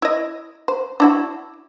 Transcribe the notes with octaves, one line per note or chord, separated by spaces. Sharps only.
E4 D#5
C5
D4 E4 F#4